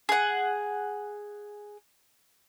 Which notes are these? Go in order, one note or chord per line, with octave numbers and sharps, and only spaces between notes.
G#4 F#5